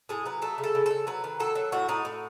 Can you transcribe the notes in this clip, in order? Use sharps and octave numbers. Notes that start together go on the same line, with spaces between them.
A2 G#4
F#3 B4
A3 A4
C#3
A4
C#3
C#3 A4
F#3 B4
D#3
F#3 A4
F#3
A2 F#4
A2 D#4
A2